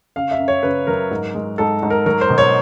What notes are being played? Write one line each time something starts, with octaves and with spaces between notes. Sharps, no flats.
C#3 F5
E5
F#2
C#5
C#3 B4
F#3 A#4
G#2
G#3
G#2 A4
G#2
A#4
F#3 A#4
C5
B2
C#5